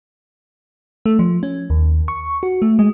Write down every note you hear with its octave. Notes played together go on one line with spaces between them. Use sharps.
A3
F3
C#4
D#2
C#6
F#4
A3
G#3